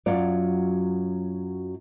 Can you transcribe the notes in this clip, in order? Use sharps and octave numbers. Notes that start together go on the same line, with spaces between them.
F#2 F#3 F4 D5